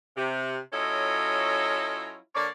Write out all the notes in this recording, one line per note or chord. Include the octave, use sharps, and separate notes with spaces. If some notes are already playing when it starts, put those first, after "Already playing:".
C3
F#3 C#4 E4 F4 A4 D#5
D3 A#3 C#5 D5